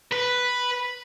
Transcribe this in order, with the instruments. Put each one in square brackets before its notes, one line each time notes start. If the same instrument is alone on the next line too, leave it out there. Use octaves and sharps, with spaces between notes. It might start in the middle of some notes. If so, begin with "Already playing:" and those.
[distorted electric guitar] B4